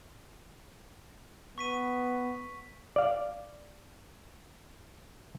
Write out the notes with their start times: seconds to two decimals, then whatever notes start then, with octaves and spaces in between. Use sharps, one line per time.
1.58 B3 C#6 B6 D#7
2.96 D5 F5